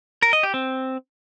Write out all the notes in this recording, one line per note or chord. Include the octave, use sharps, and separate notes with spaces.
A#4
D#5
G4
C4